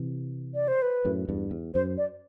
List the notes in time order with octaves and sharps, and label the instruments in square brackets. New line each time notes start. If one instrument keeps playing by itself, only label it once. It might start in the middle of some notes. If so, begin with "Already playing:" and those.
Already playing: [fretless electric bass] C3 E3
[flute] D5
C5
B4
[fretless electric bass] F#2 A2
E2 G2
E2
[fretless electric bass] F#2 [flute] C5
[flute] D5